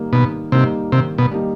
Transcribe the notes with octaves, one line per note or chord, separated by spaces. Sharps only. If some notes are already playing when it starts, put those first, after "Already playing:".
Already playing: D#3 G3 A#3 D#4
B2 D#3
C3 G3 A#3 D#4
C3 D#3
B2
G3 A#3 D#4